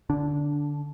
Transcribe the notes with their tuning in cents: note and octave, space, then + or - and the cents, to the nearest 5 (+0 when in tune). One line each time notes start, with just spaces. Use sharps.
D3 +0 D4 -15